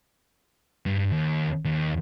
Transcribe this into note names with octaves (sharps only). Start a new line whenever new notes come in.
G2
D#2
D#2